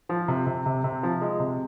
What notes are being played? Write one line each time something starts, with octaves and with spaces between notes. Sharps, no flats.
F3
C3
C3
C3
C3
F3
G#3
C3